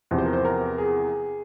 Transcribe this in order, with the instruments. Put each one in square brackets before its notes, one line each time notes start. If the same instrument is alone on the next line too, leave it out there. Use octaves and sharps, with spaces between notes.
[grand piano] E2 C3 F3
[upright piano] C5
A#4
C5
A#4
G#4